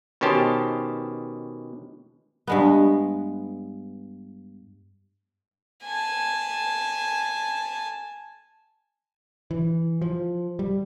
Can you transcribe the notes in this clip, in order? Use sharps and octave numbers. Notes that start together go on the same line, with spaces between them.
B2 D#3 C#4 G4 C5 A5
G2 G#3 B3
G#5 A5
E3
F3
G3